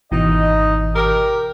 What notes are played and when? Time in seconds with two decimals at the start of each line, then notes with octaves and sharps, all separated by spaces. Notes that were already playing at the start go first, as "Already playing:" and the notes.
0.11 G#1 B2 E3 D#4 D#5
0.95 G4 A#4